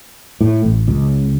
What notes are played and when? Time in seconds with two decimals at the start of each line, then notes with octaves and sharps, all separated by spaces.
0.41 A2
0.65 A1
0.88 C#2